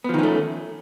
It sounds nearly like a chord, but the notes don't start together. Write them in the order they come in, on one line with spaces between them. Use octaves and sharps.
B3 F3 D#3 C#4 A3